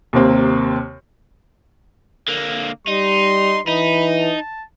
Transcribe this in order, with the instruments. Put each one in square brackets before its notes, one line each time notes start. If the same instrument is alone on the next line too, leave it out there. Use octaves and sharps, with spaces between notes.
[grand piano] D#2 C3 A#3 C4
[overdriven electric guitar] D3 A#3
[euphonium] G3 [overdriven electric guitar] D#4 [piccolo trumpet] C6
[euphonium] E3 [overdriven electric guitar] D#4 [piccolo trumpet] B5
[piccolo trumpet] A5